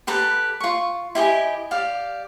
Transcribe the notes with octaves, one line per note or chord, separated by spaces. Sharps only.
G4 A4 B4 A#5
F4 C#6
E4 G4 D#5 G#5
G4 D5 F5